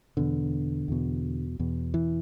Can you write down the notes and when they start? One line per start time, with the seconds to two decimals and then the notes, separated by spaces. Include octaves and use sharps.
0.17 E2 B2 D3
0.88 E2 B2
1.59 E2 B2
1.94 E3